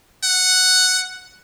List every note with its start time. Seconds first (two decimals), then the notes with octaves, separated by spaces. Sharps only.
0.23 F#5